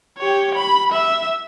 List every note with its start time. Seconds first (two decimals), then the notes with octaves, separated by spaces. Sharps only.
0.18 G4 C#5
0.55 B5
0.92 E5